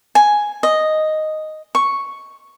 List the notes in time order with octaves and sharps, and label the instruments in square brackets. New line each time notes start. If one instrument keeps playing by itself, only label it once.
[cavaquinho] G#5
D#5
C#6